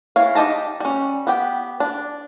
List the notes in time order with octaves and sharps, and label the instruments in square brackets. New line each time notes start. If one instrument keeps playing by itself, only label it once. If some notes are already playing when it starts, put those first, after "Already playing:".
[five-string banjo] E3 C#5 F5
D#4 G4 D#5 A5 A#5
G3 C#4
B3 G4 G5
D4